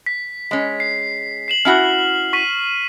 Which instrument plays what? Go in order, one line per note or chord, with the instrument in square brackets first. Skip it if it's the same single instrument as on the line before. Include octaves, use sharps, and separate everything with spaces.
[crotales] B6
[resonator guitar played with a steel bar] G#3 C#4
[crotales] C7
C7 E7 F#7
[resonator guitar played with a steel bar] C#4 E4 F#4 [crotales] F6
[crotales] C#6 B6 D#7